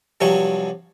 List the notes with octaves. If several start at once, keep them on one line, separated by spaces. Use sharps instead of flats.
G2 C3 F3 F#3 G#5 C#6